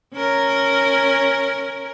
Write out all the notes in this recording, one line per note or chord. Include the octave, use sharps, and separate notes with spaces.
C#4 A#4